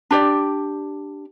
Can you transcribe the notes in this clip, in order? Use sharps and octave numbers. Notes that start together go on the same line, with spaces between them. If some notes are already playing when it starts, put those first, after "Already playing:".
D4 G4 D5